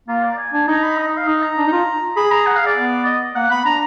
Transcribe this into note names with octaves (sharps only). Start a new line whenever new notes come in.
A#3 F4
D5
G#5
D4 G#5
D#4 A#5
B5
D#5
D#5
F5
D#4 D#5
A#5
D4
D#4
F4
G#4 B5
A#5
F#5
F5
D5
B3
D#5
A#3 F#5
B3 B5
D4 A#5